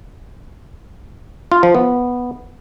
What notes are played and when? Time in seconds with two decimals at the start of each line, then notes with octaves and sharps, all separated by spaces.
1.52 F4
1.63 F3
1.75 B3